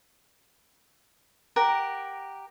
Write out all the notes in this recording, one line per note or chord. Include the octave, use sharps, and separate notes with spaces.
G4 A#4 F#5